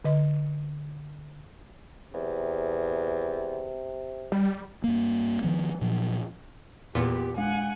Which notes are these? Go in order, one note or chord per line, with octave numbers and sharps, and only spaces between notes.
D3 D#5
E2 C3
G3
G2 A#3
D#3 F3 B3
A#2 F3 F#3
E2 A#2 B3 F4 G4
G#3 F#5 G#5